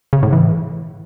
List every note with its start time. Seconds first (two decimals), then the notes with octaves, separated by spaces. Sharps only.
0.13 C#3
0.23 A2
0.33 E3